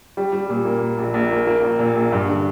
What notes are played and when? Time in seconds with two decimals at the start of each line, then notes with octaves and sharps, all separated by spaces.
0.17 G3
0.33 G3
0.50 A#2
0.65 A#3
0.82 A#2
0.98 A#1
1.14 A#1
1.31 A#3
1.47 A#3
1.63 A#1
1.79 A#2
1.95 A#1
2.12 G2
2.28 D3